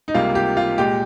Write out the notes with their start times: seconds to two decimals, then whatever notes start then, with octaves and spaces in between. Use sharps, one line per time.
0.08 D#4
0.14 C#2 C3 G3 A#3 F4
0.35 G4
0.57 F4
0.78 A#2 G#3 G4